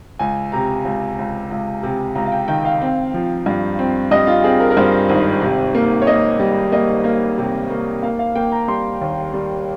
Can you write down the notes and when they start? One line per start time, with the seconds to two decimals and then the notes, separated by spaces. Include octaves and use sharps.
0.19 C#2 G#5
0.52 C3 A#5
0.85 C#2
1.18 C#2
1.51 C#2
1.83 C3
2.15 C#2 A#5
2.26 F5
2.32 G5
2.48 D#3 G5
2.65 F5
2.81 C4
3.14 F3
3.46 G2
3.79 C4
4.11 G2 D#5
4.27 F4
4.44 C4 G#4
4.60 A#4
4.70 A#4
4.77 G2 C5
5.09 G#1
5.41 C3
5.75 A#3
6.02 C#5
6.07 A#3 D#5
6.40 G3
6.72 A#3 D#5
7.04 A#3
7.38 C3
7.70 A#3
8.03 A#3 F5
8.19 F5
8.35 A#3 G5
8.52 A#5
8.68 G3 C6
9.01 D#2
9.33 G3